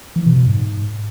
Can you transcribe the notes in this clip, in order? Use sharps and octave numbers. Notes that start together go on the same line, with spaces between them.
E3
B2
B2
G#2